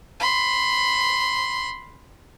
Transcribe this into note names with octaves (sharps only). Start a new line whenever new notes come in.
B5 C6